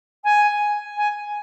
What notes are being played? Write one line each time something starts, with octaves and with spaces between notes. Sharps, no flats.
G#5
G#5